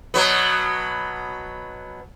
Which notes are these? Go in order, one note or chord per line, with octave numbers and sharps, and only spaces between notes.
B2 F#3 B3